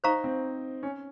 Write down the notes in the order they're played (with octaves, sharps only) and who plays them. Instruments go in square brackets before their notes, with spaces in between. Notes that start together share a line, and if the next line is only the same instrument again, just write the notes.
[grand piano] D#4 [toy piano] C5 F5 A#5 C#6
[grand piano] C4
C#4